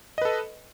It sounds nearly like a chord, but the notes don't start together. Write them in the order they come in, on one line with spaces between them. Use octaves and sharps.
D#5 B4 A4